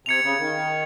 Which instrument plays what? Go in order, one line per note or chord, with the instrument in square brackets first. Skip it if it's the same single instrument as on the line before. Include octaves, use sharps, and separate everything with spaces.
[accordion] C3 [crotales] G#6 C#7 F7
[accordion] C#3
D#3